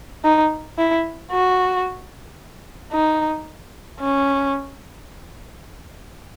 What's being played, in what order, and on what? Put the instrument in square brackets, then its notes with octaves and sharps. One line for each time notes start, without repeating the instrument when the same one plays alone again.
[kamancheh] D#4
E4
F#4
D#4
C#4